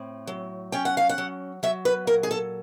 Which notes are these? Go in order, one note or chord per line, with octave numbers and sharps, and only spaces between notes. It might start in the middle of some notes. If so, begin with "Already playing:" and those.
Already playing: A2 C4
F#3
C#4 G5
F#5
F5
F#5
F#3
F#3 E5
B4
A#2 A#4
G#4
A4